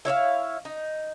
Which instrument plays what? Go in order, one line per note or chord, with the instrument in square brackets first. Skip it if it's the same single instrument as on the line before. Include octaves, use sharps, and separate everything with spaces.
[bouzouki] E4 C#5 E5 F5
D#4